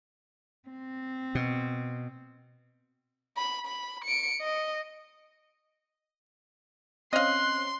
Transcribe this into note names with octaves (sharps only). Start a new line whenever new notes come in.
C4
B2
B5
B5
C#7 D7
D#5
C4 C#4 D#5 F5 C6 F#6